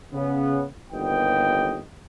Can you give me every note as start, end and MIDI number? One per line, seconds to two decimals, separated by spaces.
0.14 0.64 49
0.14 0.64 59
0.92 1.80 31
0.92 1.80 39
0.92 1.80 59
0.92 1.80 75
0.92 1.80 79